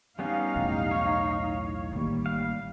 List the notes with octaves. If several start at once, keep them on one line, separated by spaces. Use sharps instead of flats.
G3 B3 C#4 D#4 F5
B1 E2 A2
C#5
A1 D#3 G3 A#3
F5